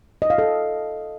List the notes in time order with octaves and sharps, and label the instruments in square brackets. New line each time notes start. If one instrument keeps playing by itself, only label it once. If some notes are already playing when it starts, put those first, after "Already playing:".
[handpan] D#5
F5
A4